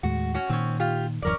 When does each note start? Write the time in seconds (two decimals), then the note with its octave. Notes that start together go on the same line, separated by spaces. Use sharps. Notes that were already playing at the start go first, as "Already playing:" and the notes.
0.03 D#2 A2 G#3 F#4
0.34 C#4 F#4
0.50 A#2 D#3 C4 C#4
0.80 F4 G4
1.22 D1 F#2 E3 C#4 A#4 D5